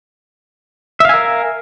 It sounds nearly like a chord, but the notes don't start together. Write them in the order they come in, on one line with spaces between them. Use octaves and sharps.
E5 F5 G#5 A#4